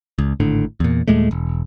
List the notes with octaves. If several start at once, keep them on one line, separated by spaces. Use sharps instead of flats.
C#2
G#1 A2 D3
E2 A#2
D#2 A#2 G#3 A3
E1